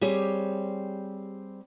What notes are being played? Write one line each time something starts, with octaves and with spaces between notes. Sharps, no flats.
G3 C4 G4 G#4 C#5